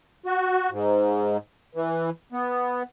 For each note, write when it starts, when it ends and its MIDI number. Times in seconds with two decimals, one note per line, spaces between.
0.26 0.70 66
0.71 1.37 44
1.75 2.10 52
2.33 2.83 59